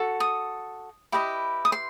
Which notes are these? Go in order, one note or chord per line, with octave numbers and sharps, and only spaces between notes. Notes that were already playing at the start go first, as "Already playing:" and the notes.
Already playing: F#4 A4
D#6
E4 G4 B4 D#5
D#6
C6